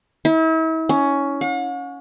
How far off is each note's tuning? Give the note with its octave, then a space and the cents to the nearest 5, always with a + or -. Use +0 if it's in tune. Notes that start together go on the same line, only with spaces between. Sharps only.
E4 -40
C#4 +10
F#5 -45